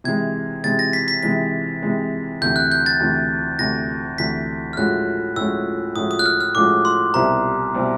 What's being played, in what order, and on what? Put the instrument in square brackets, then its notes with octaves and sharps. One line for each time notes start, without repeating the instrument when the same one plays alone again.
[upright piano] C3 E3 G#3 [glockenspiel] G#6
[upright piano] C3 E3 G#3 [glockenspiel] A6
[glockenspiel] A#6
B6
B6
[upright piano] C3 E3 G#3 [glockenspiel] B6
[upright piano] C3 E3 G#3
[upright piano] D2 C3 E3 [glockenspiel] G6
[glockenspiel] F#6
G6
A6
[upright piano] D2 C3 E3
[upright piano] D2 C3 E3 [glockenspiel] A#6
[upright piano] D2 C3 E3 [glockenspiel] B6
[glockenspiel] F6
[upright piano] A2 F3 G#3 C#4 F#4 [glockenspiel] F#6
[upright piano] A2 F3 G#3 C#4 F#4 [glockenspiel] E6
[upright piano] A2 F3 G#3 C#4 F#4 [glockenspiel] D#6
[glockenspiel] D#6
F#6
F6
F6
[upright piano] A2 F3 G#3 C#4 F#4 [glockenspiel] D6
[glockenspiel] C6
[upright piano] C2 B2 G3 C4 E4 [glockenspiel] A#5
[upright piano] B2 G3 C4 E4